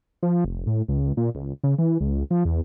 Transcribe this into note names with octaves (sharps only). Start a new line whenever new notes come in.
F3
F1
A2
C#2
A#2
C#2
C#3
E3
C#2
F3
E2